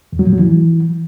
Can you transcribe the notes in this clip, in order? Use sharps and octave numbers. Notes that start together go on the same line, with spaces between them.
E2
F#3
A2
F#3
E3